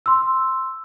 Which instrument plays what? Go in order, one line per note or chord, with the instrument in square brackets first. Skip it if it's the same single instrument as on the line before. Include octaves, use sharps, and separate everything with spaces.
[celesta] C6 E6